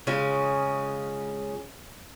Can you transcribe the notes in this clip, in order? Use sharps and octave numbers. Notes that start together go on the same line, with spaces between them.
C#3 G#3 C#4 F4